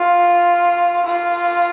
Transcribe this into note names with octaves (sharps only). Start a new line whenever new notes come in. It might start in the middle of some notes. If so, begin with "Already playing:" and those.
Already playing: F4
F4